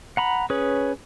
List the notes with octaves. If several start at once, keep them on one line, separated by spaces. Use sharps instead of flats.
F#5 A#5 B5
C#4 G#4 B4 C#5